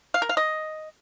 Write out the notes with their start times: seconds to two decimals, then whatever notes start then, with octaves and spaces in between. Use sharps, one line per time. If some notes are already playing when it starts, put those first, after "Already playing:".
0.14 F5
0.22 A#4
0.29 F5
0.37 D#5